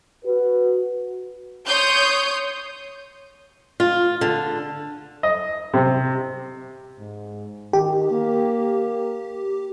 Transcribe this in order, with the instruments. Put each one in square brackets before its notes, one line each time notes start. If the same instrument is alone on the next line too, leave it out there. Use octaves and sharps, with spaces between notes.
[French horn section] F#4 B4
[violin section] C#5 C6 D#6 G6
[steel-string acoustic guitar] F4
D3
[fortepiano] D#5
C3
[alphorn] G#2
[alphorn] D#3 [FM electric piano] G4
[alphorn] A#3